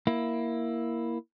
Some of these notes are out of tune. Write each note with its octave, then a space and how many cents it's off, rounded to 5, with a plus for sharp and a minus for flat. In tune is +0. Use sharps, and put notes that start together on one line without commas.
A#3 +5 E4 +0